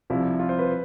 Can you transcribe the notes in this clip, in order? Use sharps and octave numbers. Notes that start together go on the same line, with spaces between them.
C2 C3 F3 E4
F4
C5
B4